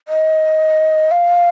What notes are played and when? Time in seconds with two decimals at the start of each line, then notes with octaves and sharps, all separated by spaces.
0.08 D#5
1.11 F5